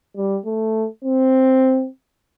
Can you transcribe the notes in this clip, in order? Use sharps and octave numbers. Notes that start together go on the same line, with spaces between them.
G3
A3
C4